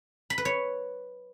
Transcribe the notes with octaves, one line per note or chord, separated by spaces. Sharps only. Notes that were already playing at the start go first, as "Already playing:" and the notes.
B5
B4
C#5